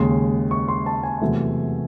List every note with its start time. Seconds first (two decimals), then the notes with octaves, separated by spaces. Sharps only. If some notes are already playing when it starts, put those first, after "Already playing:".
Already playing: D#2 C#3 G#3 C6
0.51 C#6
0.68 C6
0.86 A5
1.03 G#5
1.22 E2 C3 F#3 A3